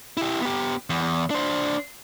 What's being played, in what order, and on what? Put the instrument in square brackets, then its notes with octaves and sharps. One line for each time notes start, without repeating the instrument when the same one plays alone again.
[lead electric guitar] E4 G4
B3 G4
E2
D4 C5